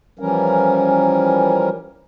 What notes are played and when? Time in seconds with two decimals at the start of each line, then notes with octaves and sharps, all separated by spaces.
0.19 E3 F3 G3 C#4 A#4